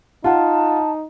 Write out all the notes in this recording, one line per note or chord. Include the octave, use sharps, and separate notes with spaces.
D#4 F4 F#5 A5